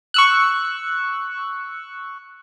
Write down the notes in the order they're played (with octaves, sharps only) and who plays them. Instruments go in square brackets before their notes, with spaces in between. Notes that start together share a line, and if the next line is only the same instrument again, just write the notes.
[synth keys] C#6 E6 F#6